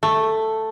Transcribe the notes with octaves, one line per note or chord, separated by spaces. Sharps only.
A3